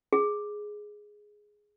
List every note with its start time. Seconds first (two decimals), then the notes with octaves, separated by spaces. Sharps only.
0.13 G#4